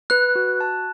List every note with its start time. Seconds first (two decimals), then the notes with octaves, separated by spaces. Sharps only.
0.10 B4 F#6
0.35 F#4
0.60 A5